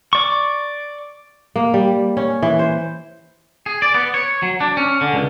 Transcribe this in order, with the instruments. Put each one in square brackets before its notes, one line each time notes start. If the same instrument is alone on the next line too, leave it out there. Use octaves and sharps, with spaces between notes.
[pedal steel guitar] D5 C#6
[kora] A#3
G3
C#4
E3
C5
[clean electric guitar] G#4
D5
B3
C#5
F#3
D4
C#4
D3
C#2